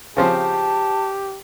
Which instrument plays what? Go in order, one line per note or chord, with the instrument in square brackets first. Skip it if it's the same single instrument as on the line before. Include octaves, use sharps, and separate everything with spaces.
[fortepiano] C#3 F3 C4 [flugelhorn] G4 [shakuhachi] A5